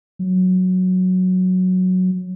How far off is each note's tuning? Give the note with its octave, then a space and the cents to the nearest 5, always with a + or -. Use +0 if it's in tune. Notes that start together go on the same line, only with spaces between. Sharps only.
F#3 -5